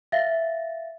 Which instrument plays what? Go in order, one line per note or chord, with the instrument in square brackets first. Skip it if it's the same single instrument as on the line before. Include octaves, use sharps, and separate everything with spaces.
[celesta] E5 F5 A6 A#6